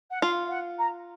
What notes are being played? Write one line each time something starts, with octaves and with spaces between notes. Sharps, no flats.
F#5
F4 F5
F5
F#5
A#5